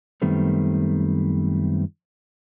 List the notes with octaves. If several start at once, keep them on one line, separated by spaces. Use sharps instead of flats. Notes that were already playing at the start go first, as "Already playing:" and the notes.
F#2 D#3 G3 A3 B3 C4